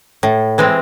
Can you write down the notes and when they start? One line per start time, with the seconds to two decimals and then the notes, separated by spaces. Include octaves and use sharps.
0.23 A2
0.58 E3 G#3 C4